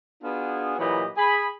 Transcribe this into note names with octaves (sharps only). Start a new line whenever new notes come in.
B3 D4 F4 F#4 G#4
A#2 E3 F#3 G4 D#5 B5
G#4 B5